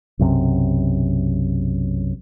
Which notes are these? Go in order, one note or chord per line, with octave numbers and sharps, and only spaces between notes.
B1 F#2 C3